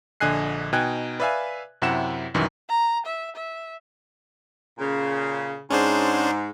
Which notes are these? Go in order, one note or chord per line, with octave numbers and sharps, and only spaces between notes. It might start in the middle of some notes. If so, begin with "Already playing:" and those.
A#1 D3 D#5 G#5 F#6 C7
B2 D#4 G5 G#5 F#6 G#6
B4 D5 E5 F5 G#5
F#2 C3 E4 G4 F#5 E7
C2 F#2 D#3 E3
A#5
E5
E5
A#2 C#3
G#2 C#4 D4 C5